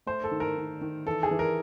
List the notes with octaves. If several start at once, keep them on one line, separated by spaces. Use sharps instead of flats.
A3 C5
A4
D#3
A#4
D#3
D#3
E3 A4
G#4
E3
A#4